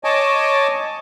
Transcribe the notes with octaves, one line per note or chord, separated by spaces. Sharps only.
C#5 D#5 G#5 A5 D6